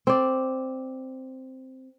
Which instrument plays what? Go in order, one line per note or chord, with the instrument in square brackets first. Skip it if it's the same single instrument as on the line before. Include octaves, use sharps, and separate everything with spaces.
[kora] C4 D5